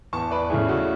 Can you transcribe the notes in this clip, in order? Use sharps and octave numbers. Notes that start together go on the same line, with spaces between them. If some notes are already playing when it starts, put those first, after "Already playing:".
E2 A5 C#6
B4 D5
C#3 E3 A3 G#4
F#4 A4